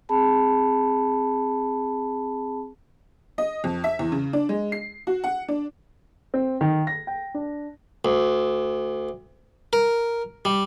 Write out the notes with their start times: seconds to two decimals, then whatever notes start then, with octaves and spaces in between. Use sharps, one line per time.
0.09 C4 G#4 A5 B5
3.38 D#5
3.64 F2
3.84 E5
3.99 E2
4.12 C#3
4.33 D4
4.49 G#3
4.72 C7
5.07 F#4
5.24 F#5
5.48 D4
6.34 C4
6.61 D#3
6.87 A#6
7.07 G5
7.34 D4
8.05 D2
9.73 A#4
10.45 G3